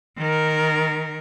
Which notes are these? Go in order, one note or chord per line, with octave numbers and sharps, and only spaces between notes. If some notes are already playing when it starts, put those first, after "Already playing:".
D#3 A#4